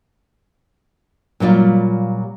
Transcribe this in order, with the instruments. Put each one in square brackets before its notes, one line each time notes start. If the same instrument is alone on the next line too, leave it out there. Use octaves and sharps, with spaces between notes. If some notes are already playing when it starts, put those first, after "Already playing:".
[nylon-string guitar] A#2 F#3 G3 F4 D5